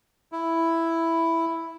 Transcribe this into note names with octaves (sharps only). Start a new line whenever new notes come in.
E4